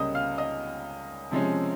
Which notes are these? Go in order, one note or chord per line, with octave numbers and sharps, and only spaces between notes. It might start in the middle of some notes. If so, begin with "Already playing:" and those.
Already playing: C#2 C#3 G3 A#3 C#4 D#5 D#6
F5 F6
D#5 D#6
C3 F3 G#3 C#4